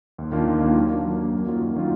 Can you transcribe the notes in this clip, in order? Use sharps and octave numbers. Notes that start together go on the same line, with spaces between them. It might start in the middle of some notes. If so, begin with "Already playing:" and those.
D#2
D#3 A#3 D4 F4
D#2
D#3 A#3 D4 F4
F#3
A#3 D4
F#3
A#3 D4
F#2
D#3 F#3 A#3 F4
F#2
D#3 F#3 A#3 F4